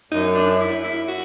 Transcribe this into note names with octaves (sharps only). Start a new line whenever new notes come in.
F#2 D#4
D4
E4
E4
F#4